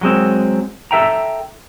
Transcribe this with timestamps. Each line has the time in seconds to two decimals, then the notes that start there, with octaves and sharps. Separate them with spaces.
0.01 F#3 G#3 C4
0.91 A4 E5 G5 A#5